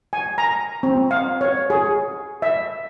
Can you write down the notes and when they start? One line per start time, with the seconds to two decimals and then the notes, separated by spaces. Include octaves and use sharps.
0.13 G#5
0.38 A#5
0.83 C4
1.11 F5
1.41 C#5
1.70 G#4
2.42 E5